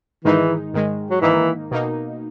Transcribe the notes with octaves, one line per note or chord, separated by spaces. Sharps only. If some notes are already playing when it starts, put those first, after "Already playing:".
G#2 D#3 E3 G#3 D#4
G#2 D#3 G#3
F#3
G#2 D#3 E3 A#3 D#4
B2 A#3 D#4